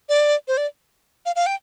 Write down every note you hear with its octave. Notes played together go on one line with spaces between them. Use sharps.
D5
C5
D5
F5
F5
G5